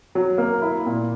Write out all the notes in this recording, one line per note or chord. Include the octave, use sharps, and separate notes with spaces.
F#3
A#3
E4
A#2